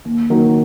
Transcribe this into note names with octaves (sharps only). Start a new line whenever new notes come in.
D#2
D#3 F#3 A#3 D#4